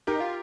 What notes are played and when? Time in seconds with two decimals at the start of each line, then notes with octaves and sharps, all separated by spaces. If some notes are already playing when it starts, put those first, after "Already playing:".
0.07 D#4 G4 A#4
0.20 F4